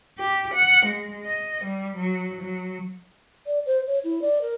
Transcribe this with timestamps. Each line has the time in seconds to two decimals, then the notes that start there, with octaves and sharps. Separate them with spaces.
0.18 G4
0.55 F#5
0.86 G#3
1.26 D#5
1.65 G3
1.97 F#3
2.41 F#3
3.46 D5
3.66 C5
3.87 C#5
4.04 E4
4.22 D5
4.42 A#4